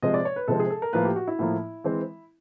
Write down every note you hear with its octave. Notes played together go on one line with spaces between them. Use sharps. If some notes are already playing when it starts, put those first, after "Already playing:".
C3 F3 G#3 C4 D#5
D5
C#5
B4
C3 F3 G#3 C4 A4
G#4
A4
A#4
A2 F3 A#3 B4
G4
F#4
E4
A2 F3 A#3
E3 G#3 C4